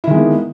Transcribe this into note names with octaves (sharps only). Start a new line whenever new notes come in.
D#3 G#3 A#3 B3 E4